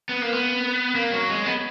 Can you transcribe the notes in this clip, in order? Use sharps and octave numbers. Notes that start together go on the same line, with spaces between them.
B3
A#3
B3
A#3
F#3
G#3
B3